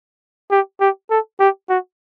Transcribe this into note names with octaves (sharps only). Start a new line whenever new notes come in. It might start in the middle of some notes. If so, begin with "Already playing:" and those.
G4
G4
A4
G4
F#4